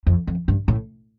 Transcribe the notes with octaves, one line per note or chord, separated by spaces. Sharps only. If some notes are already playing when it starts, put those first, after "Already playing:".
F2
F2
G2
A2